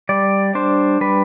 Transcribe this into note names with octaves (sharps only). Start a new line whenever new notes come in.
G3 D5
D4 C5
G3 B4